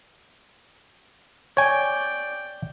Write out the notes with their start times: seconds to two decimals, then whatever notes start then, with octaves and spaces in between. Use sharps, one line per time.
1.57 C#5 D5 G5 G#5